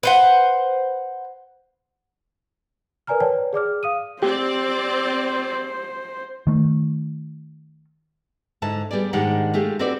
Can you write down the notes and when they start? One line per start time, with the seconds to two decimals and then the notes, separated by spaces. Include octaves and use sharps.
0.03 B4 C5 F#5
3.07 A#4 B4 D5 G#5 A#5 F6
3.20 B4 C#5 D5 G5 A5
3.53 G#4 D5 D6 F6
3.83 F5 D#6 D#7
4.23 C4 G4 C5 D5
6.47 D#3 A3
8.62 G#2 D3 E4 A5
8.91 G3 B3 G#4 D5
9.13 G#2 D#3 G#3 D4 G4 F#5
9.54 G#3 A3 F4 G4 G#4
9.79 C4 F#4 A4 B4 C5 D5